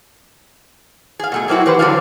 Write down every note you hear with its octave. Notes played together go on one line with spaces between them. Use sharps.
G#4 F5
B2 A3 G#4
F#3 A#3 C4 E4 F#4
E3 G4 B4 C5
F2 D3 F#3 D4 F#4 F5